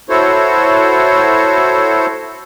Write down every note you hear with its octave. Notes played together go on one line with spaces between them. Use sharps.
E4 F#4 A4 C5 C#5